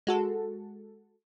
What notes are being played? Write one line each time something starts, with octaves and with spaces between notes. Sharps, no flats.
G#3 F#4 A4